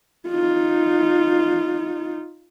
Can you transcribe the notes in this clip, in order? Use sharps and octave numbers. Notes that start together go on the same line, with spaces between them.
D#4 F4